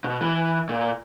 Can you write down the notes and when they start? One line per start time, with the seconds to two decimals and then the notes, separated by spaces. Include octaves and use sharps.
0.04 B2
0.21 E3
0.69 A#2